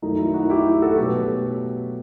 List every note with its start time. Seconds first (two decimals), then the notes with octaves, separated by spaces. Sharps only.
0.02 F#2 D#3 F#3 A3 D#4
0.19 E4
0.34 D#4 F#4
0.50 E4 G4
0.82 F#4 A4
0.97 B2 F#3 A3 G4 B4